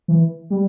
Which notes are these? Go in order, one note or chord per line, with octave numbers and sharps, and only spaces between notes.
E3
G3